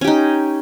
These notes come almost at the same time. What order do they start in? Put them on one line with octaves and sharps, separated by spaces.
C#4 G4 D#4